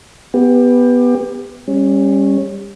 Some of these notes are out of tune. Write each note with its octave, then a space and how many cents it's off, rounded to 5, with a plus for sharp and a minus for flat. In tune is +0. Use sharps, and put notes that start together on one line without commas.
B3 +0 G4 +25
G3 +25 C#4 -15